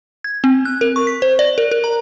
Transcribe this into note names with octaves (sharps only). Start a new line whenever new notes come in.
G#6
C4
F#6
A#4
C#6
B6
C5
D5
A#4
A#4
A#5